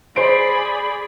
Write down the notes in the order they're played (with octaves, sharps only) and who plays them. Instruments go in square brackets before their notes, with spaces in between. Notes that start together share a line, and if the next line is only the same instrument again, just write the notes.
[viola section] G#4 D5 B5 [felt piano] C5 C6 D7